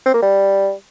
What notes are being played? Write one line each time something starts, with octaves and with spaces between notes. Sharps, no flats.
C4
A#3
G3